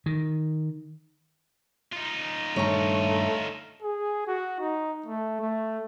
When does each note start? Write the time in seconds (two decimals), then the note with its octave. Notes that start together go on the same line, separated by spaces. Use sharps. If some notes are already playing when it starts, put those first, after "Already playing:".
0.06 D#3
1.93 D#4 F4
2.56 G2 A#2 D#3 A3 C#5 A#5
3.82 G#4
4.27 F#4
4.60 D#4
5.06 A3
5.40 A3